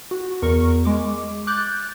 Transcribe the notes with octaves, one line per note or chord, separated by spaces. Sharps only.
F#4
E2 A#4 C#6
G#3 D6
D6 F#6 G6 A6